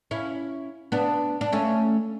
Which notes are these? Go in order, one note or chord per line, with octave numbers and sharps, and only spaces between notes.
C#4 E4
B3 D4
D4
A3 C#4